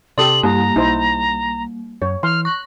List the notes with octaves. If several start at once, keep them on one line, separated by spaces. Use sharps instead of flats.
C3 G4 A4 D5 C6 D#6 F#7
G2 G3 A#3 A#5
B1 D#4 E4 C5
F#2 C#5
E3 C6 F6
C#6 F#6